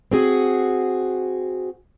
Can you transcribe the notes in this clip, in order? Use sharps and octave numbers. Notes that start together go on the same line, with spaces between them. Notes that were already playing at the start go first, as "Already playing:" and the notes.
C4 F#4 G#4